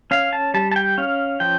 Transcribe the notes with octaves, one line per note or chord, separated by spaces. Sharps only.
C#4 F5
A5
G3 A5
A5
G5
C#4 F5
F3 G5